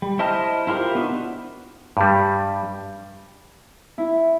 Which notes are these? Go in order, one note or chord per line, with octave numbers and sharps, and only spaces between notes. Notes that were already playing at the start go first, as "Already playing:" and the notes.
G3
E4 C5 D#5 A5 F6
E4 F4 G4 A#4 C5
B3 D4 D#4 F#4
G2 G3
E4